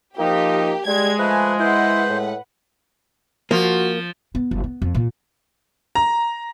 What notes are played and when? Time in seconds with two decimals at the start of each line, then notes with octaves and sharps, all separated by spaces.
0.19 F3 A#3 D#4 G4
0.87 G3 G#3 G#6
1.19 F3 A3 B4 G#5
1.59 E4 B4 C5 F#5
2.09 A2
3.51 F3 A#3 F#4
4.35 B3
4.51 F#1
4.64 B3
4.82 F2
4.95 A#2
5.95 A#5